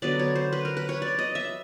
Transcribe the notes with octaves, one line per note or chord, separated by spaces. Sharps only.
D3 F#3 B3 D5
C#5
C5
B4
A#4
B4
C#5
D5
D#5
E5